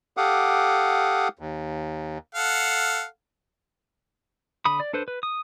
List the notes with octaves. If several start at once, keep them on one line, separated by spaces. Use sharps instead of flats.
G4 A4 F5 F#5 D6 D#6
D#2
A4 F5 F#5
D3 B5 D#6
D5
D4 A4 B4 C5
B4
D#6